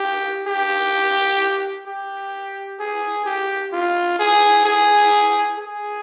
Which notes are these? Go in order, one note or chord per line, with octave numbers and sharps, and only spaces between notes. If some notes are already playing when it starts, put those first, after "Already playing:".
Already playing: G4
G4
G4
G#4
G4
F4
G#4
G#4
G#4